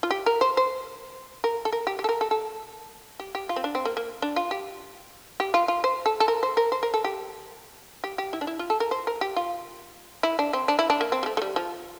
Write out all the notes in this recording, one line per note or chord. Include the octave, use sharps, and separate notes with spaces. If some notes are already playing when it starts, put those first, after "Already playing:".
F4
G4
A#4
C5
C5
A#4
A4
A#4
G4
G4
A4
A#4
A4
A4
G4
G4
F4
C4
D4
C4
A#3
A#3
D4
F4
G4
G4
F4
F4
C5
A4
A4
A#4
C5
A#4
C5
A#4
A4
G4
G4
G4
E4
D4
E4
F4
A4
A#4
C5
A#4
G4
F4
E4
D4
C4
D4
E4
D4
A#3
C4
G3
A3
A3
G3
F3